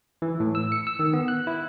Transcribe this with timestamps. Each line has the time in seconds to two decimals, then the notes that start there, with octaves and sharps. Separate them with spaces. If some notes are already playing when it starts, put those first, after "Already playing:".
0.22 E3
0.40 A2
0.55 E6
0.72 C#7
0.87 E6
0.99 D#3
1.13 B3
1.28 F#6
1.47 E4